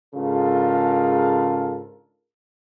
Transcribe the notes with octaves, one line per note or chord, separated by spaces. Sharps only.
G#2 C#3 D4 F4 A4 A#4